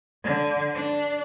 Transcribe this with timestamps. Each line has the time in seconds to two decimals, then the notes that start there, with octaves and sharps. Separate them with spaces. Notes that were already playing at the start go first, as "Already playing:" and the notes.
0.24 D3
0.75 D4